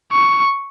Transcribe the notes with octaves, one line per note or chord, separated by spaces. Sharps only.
C#6